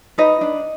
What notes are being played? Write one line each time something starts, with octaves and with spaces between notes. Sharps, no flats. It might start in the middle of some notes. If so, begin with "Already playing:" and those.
D#4 B4 D#5
D4